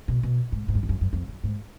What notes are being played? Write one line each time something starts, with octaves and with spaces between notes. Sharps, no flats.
B2
B2
G#2
G#2
F#2
F2
F#2
F#2
F2
F#2
G#2